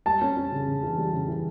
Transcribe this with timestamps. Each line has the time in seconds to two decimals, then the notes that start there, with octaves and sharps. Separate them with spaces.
0.06 G3 A5
0.22 C#4
0.37 C#4
0.52 C#3
0.68 C#3
0.83 E3
0.98 G3
1.13 C#3
1.28 E3